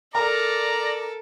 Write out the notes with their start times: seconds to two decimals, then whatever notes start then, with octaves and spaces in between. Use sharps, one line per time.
0.15 A4 A#4 D5 A#5